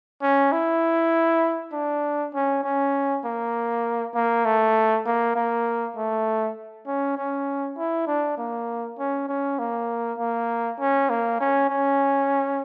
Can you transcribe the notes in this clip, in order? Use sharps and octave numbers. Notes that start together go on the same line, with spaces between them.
C#4
E4
D4
C#4
C#4
A#3
A#3
A3
A#3
A#3
A3
C#4
C#4
E4
D4
A#3
C#4
C#4
A#3
A#3
C#4
A#3
C#4
C#4